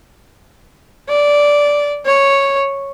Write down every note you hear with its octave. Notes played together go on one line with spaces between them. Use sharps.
D5
C#5